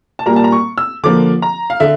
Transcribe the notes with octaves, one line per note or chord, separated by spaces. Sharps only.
A5
A#2 G3 A#3 A#5
A5
A#5
C#6
E6
D3 F3 A#3 D6
A#5
F5
D3 E5